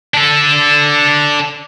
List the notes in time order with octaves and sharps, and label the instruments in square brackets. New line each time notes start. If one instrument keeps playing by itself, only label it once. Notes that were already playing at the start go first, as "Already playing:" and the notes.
[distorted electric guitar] D4 A4